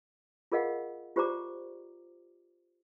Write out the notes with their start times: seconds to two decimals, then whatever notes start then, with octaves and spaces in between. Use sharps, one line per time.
0.52 F4 G#4 A#4 D#5 F5 F#5
1.16 F4 G4 C5 D5 A#5 D6